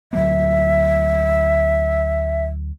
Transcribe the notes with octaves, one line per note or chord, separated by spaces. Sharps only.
D2 F#3 A#3 E5